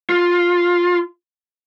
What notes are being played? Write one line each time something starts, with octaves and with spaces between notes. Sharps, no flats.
F4